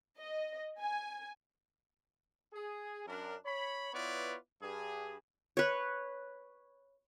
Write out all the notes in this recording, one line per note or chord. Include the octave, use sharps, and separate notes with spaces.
D#5
G#5
G#4
F#2 D4 A#4
C#5 B5
B3 E4 F4 B4 C#5 D5
G2 G#4
B4 C#5